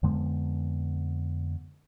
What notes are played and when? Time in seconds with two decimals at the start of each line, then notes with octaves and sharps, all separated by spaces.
0.03 F2 D3 G#3 B3